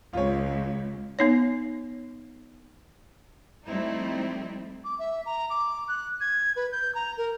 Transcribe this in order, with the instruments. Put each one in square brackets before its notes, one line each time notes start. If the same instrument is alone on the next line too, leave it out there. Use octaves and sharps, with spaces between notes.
[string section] C#2 [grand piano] F4 C#5
[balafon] B3 D#4 C#5
[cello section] F3 G3 A3 C4 D#4 E4
[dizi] D6
E5
A#5
D6
F#6
G#6
B4
G6
A#5
A#4